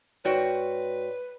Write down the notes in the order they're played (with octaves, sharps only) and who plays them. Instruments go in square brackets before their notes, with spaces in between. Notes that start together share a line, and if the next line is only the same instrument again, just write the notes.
[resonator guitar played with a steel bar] G#2 F#4 G5 [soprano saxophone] B4 [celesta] C#5 D5